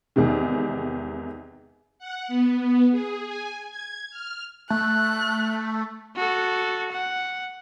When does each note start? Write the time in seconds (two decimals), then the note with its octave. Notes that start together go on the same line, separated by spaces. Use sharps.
0.16 E2 G#2 C3 D#3
1.99 F#5
2.28 B3
2.58 B3
2.91 G#4
3.29 G#5
3.69 G#6
4.11 F6
4.70 A3 F#6
6.16 F#4 A4
6.92 F#5